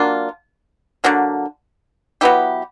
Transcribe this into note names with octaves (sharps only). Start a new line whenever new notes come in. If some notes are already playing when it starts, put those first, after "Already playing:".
Already playing: F#3 A#3 D4 F4
D3 F#3 A#3
F#3 B3 E4 G4